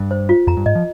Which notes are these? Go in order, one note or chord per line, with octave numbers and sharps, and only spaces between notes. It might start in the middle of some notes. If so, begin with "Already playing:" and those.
Already playing: G2
C5
F4
F2 A#5
G2
G#2 D#5
F3